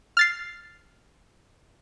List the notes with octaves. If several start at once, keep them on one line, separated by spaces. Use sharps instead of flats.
F6 A6 C7